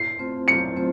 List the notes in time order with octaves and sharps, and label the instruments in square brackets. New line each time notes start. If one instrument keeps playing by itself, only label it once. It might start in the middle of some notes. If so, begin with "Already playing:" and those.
Already playing: [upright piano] C7
[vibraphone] A3 C4 F4 C5
[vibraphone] F#3 [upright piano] C#7
[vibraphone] A3 C4 F4 C5